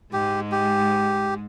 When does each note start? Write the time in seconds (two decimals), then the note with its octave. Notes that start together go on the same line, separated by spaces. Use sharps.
0.12 G#2 G#3 G4
0.52 G4